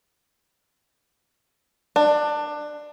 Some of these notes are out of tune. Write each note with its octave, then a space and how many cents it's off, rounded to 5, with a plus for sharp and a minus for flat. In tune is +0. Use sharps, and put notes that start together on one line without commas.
D4 +20